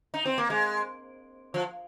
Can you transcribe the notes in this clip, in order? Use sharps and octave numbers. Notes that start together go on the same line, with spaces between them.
D#4
C4
A#3
G#3
F3